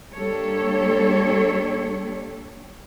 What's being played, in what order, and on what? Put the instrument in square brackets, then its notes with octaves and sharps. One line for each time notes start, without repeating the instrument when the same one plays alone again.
[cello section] G3 A#3 D4 G4 A4 C#5